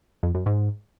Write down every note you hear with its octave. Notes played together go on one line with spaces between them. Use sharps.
F2
F#2
G#2